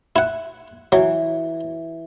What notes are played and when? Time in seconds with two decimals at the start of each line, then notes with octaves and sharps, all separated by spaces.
0.16 E4 F#5
0.92 E3 F#3